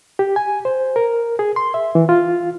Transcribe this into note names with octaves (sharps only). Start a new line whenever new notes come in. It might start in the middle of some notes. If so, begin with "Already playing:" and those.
G4
G#5
C5
A#4
G#4
C6
E5
E3
F4